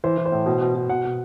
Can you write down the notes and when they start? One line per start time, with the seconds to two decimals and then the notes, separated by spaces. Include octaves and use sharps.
0.04 E3 C5
0.18 E3
0.26 C5
0.32 A2
0.46 B2
0.61 B2
0.75 B2
0.89 B2 F#5
1.04 B2